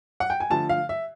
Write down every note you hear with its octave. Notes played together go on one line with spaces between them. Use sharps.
F#5
G5
G#5
D3 F3 A3 A5
F5
E5